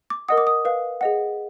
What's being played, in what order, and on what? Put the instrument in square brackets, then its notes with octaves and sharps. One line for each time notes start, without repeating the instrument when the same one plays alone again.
[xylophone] D6
A#4 D#5 F#5 D#6
D6
D#6
B4 F5
G#4 D#5 F#5